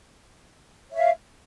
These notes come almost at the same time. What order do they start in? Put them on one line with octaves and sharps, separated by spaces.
C#5 E5 F5